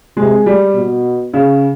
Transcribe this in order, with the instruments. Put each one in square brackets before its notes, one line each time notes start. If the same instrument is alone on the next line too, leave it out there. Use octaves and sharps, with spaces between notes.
[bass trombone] C3 [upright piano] G#3
[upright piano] G3
[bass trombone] B2
[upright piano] C#3